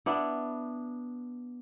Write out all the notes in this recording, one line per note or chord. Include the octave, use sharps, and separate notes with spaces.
B3 D4 E4